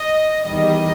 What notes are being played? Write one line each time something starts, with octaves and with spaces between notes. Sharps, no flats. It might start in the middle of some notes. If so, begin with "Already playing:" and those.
Already playing: D#5
E2 D#3 G3 D#5